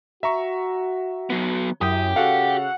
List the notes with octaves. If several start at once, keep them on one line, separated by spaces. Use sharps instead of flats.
F#4 E5 A#5 C#6
F#3 B3
F#2 E4 G4 G5 D#6
C#3 F#4 A4 F5 F#5